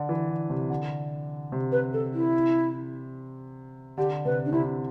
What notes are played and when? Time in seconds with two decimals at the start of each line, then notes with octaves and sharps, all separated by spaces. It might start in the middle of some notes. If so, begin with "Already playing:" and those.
Already playing: D3
0.09 E3
0.29 D3
0.50 C3
0.70 D3
1.52 C3
1.72 B4
1.93 A4
2.14 E4
3.98 D3 G4
4.25 C3 B4
4.46 D4
4.52 C3 E4